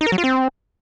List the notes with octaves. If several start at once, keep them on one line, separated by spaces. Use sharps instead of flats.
D#4
A#4
F#3
F4
C4